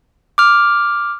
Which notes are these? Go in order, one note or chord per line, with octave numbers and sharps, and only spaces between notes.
D6 F6